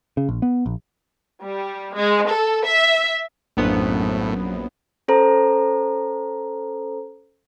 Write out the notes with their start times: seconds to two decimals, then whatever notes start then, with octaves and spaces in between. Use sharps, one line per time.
0.17 C#3
0.29 A#1
0.42 B3
0.66 A#1
1.43 G3
1.95 G#3
2.29 A4
2.64 E5
3.57 A#1 F#2 A2 A#3 B3 D4 C5
5.08 C#4 A4 C5 A#5